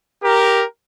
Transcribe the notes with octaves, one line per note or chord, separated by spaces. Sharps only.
G4 A#4